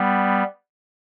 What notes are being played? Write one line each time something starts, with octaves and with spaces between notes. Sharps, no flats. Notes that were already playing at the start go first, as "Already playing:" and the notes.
Already playing: G3 B3